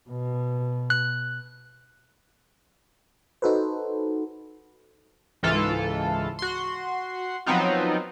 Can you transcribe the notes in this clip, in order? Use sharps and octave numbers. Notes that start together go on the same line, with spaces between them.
B2
F#6
D#4 F#4 A4 B4 C5
C#2 G#2 E3 F4 A4
F#4 C6
F3 F#3 B3 C4 D#4 F4